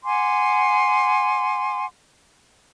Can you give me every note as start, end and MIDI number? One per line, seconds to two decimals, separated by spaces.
0.04 1.86 78
0.04 1.86 80
0.04 1.86 84
0.04 1.86 86